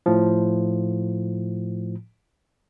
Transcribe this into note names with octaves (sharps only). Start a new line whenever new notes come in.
A2 F3